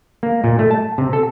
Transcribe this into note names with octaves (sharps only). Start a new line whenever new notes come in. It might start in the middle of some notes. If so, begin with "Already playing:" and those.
A#3
A#2
A3
A5
C3
A4